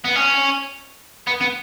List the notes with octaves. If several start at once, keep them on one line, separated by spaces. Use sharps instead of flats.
B3
C#4
B3
B3